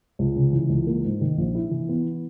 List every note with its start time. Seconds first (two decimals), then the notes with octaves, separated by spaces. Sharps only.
0.19 C#2
0.36 C#3
0.53 E3
0.69 C#2
0.87 A#3
1.04 G#2
1.21 D#3
1.38 A#1
1.55 E4
1.71 E3
1.89 B3